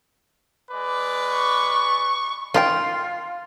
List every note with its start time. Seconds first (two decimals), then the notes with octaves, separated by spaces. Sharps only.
0.71 G#3 B4 D5
1.34 C#6
2.54 D#3 F4 F#4 G5